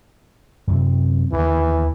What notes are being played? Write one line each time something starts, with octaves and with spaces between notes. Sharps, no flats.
F#2 C3 C4
D#2 D3 E3